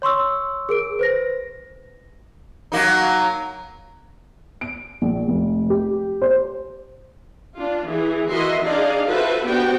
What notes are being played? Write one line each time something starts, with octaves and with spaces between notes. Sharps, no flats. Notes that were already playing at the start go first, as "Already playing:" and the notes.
C#5 C6 C#6 E6
G#4 A#4 D7
B4 C5 A#6
F#3 A#3 D#4
D7
A#1
F1
G4
C5
D4 F4
E3 G#4
E3 F#4 A#4 D#5 E5 C6
D4 D#4 G#4 D5 D#5 F5
F4 F#4 A4 B4 C5 E5
B3 D4 F#4 G4 C5 G5